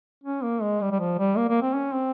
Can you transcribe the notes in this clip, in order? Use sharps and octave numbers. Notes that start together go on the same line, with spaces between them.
C#4
A#3
G#3
G3
G3
F3
G3
A#3
A#3
C4
C#4
C4